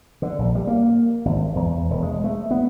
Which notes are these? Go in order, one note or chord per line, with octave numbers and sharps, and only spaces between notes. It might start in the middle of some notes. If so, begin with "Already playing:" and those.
D3
A#1
G3
A#3
G#1
E2
E1
G#3
A3
B3